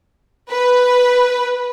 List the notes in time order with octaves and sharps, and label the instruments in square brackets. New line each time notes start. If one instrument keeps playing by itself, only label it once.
[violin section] B4